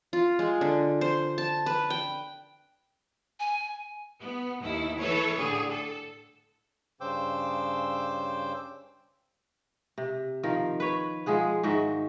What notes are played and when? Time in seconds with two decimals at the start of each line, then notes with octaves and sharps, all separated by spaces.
0.13 F4
0.39 G#3
0.61 D3
1.01 C5
1.38 A5
1.66 B4
1.90 G5
3.40 G#5
4.23 B3
4.62 D#2 E4
4.99 E3 A4 B4 C#5
5.37 A2 D3 G#4
5.71 A4
7.01 G2 C#3 C5 G5 D6 E6
9.98 C3
10.43 D#3 F3 A#4
10.80 B4 C#5
11.26 F3 G#3 G#4 F#5
11.63 G#2 D#3 F#4 E5